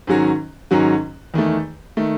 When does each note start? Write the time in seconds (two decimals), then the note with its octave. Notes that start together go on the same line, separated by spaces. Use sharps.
0.07 G#2 D#3 F#3 C#4 F#4
0.71 G#2 D#3 F#3 C#4 F#4
1.34 E2 D#3 A3
1.97 D#3 A3